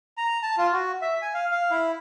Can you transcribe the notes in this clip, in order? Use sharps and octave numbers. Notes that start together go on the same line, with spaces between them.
A#5
A5
F4
F#4
E5
G#5
F5
F5
E4